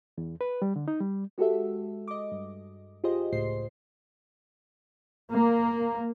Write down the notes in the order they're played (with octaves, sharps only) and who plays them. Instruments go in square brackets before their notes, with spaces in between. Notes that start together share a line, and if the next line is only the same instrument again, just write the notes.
[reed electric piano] E2
B4
G3
D3
D#4
G3
[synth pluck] G#3 F#4 G4 A4 E5
D#5 D6
G2
F4 G4 G#4 C5 D#5
C#2 A2 C5 C7
[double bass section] A#3